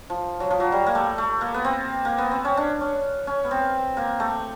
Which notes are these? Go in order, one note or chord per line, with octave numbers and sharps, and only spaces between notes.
F3
F#3
F3
F#3
G3
A#3
A3
A3
A#3
B3
C4
A#3
B3
C4
C#4
D4
C#4
C#4
B3
C4
A#3
A3